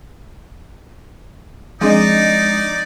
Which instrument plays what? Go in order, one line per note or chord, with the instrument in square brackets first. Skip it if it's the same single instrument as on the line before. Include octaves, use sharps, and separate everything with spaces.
[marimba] F3 C4 G#4 [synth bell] G#3 D4 D#5 [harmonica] D#4 D5